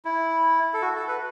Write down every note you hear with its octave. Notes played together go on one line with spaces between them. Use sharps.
E4
A4
F#4
A4
B4